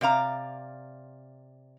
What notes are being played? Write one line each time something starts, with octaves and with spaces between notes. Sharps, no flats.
C3 D5 F5 A#5